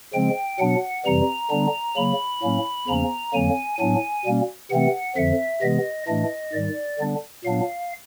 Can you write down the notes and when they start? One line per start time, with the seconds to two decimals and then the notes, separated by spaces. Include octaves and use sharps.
0.14 C#3 F3 G#3 C4 G5
0.59 B2 F#3 B3 D4 F#5
1.05 F2 C3 E3 G3 A#5
1.51 D3 G3 B3 D4
1.96 C#3 F#3 A#3 B5
2.42 A2 F#3 A#3 C#4
2.88 E2 C#3 F3 A#3 C#4 A#5
3.33 F2 D3 F#3 A#3 G#5
3.79 A2 F#3 B3 D4 G#5
4.25 B2 G3 A#3 C#4
4.70 C3 E3 A3 C4 F#5
5.16 F2 D3 F3 E5
5.62 C3 E3 G#3 B3 D#5
6.08 A2 E3 A3 D4 D#5
6.53 G#2 D#3 G3 D5
6.99 D3 G3 B3 D4
7.45 A#2 F#3 B3 D4 F5